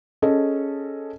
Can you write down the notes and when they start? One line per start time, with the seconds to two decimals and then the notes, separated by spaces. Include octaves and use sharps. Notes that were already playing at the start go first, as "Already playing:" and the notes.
0.22 C#4 G#4 A4 D#5